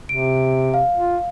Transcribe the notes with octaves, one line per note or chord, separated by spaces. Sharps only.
C3 D7
F5
F4